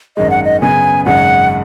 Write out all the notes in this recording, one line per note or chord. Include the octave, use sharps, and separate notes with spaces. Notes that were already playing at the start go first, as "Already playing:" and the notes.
G#1 F#2 D#3 G#3 D#5
F#5
D#5
F#2 C#3 B3 G#5
G#1 F#2 C#3 G#3 F#5